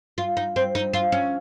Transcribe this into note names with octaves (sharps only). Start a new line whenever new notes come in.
F4
D#4
C4
D#4
F4
C#4